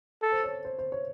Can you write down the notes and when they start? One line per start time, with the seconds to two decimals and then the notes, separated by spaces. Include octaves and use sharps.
0.23 A4
0.32 C5
0.44 C#5
0.65 C5
0.79 C5
0.92 C#5